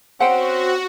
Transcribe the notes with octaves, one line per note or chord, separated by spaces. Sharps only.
C4 C#4 F#4 C5 F#5 G5